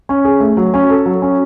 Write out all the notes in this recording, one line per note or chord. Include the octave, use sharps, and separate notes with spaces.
C#4
G#4
A3
F#3
C#4
A4
F#3
C#4